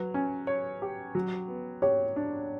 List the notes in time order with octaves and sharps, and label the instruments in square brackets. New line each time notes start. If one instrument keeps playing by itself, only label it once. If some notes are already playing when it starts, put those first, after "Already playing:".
Already playing: [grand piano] F#3 [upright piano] B4
[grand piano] C#4
C#5
G4
F#3
B3
[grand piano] G4 [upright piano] C#5
[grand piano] D4